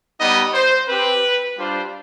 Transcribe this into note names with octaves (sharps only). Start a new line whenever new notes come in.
G3 B3 D#4 D#5
C5
C4 G4 B4
G3 D4 F4 C5